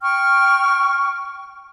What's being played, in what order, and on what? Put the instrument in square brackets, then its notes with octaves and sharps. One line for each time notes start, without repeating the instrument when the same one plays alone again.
[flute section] G5 C#6 F6